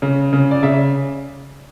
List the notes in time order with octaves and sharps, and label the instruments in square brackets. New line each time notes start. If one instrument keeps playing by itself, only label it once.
[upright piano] C#3
C#3
D5
C#3 E5